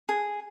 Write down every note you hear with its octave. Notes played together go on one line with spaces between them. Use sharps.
G#4